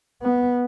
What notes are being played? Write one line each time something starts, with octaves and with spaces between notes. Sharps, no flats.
B3